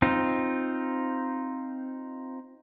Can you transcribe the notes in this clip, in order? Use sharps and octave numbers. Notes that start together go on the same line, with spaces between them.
C4 D#4 F4